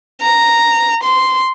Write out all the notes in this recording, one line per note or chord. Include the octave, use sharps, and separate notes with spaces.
A#5
C6